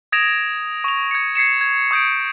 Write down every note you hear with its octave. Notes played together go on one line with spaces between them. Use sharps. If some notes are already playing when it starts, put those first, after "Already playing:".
D#6 G#6 A#6 D7 E7 F7
C#6 F7
G#6 C#7
G#6 C7 C#7 E7
G#6
C#6 D#6 G6 C#7 D7